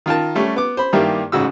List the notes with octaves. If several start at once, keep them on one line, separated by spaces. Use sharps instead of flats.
D#3 F4 A#4 A5
G3 A3 C#4
B3 D6
C5 B5
G2 D#3 G3 A#3 E4 G4
A1 G#2 C#3 F#4 E6